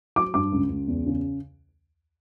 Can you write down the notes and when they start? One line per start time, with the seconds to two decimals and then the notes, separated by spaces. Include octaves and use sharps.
0.16 F#3 D6
0.34 G2 D6
0.52 C#2
0.69 C#2
0.88 E2
1.06 C#3